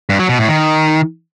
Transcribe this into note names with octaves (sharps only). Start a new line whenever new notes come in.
G2
F#3
B2
A2
D#3